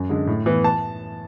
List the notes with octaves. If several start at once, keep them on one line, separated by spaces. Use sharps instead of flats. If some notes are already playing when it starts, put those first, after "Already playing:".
Already playing: F#2
D3 G#3
A2
E3 B3
A5